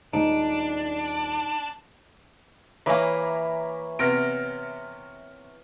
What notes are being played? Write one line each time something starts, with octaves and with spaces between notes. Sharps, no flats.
D#1 G#3 D4 D#4 C5
E3 A#3 C#5 E5 G#5 A#5 B5 D6
C3 B3 F6 A#6 D7